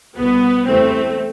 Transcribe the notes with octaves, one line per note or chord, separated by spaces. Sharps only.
C2 B2 B3
E2 C3 E3 A3 C4